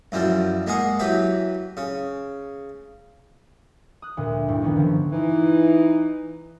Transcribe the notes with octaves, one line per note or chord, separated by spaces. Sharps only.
F#2 E3 F3 G3
G#3 A#3 G#4 F#5
E3 F#3 G4 B4
C#3
D#6 F#6
D2 A#2
G2 G3 E4
D#3 G3 B3 C#4 D#4
D3 F3
E3 D#4